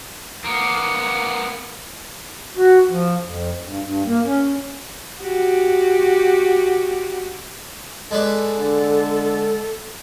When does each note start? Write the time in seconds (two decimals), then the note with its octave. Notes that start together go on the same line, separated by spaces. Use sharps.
0.45 A#3 B3
2.57 F#4
2.90 F3
3.24 F2
3.64 G2
3.82 G2
4.06 A#3
4.25 C#4
5.21 F#4 G4
8.11 G#3 A4 B4 D5
8.59 D3